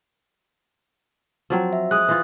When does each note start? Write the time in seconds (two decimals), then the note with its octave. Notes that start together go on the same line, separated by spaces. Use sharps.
1.50 F3 F#3 C4
1.73 E5
1.91 G#3 D#6 F#6
2.09 E3 F4